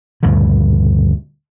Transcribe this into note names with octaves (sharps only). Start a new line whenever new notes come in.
D2 G2 A#2 C#3